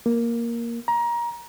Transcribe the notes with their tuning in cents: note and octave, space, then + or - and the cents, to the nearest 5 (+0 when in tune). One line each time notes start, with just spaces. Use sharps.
A#3 +5
A#5 +25